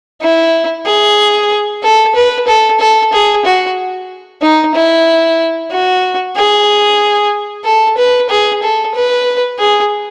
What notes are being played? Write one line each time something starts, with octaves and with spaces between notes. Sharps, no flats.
E4
G#4
A4
B4
A4
A4
G#4
F#4
D#4
E4
F#4
G#4
A4
B4
G#4
A4
B4
G#4